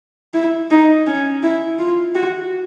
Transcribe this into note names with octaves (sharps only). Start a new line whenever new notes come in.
E4
D#4
C#4
E4
F4
F#4